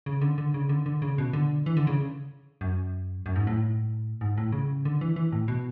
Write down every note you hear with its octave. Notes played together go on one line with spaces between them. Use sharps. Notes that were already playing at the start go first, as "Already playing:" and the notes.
C#3
D3
D3
C#3
D3
D3
C#3
B2
D3
E3
D3
C#3
F#2
F#2
G#2
A2
G#2
A2
C#3
D3
E3
E3
A2
B2